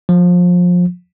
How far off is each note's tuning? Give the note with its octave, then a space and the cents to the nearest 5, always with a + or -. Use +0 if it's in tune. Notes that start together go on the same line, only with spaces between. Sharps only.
F3 +25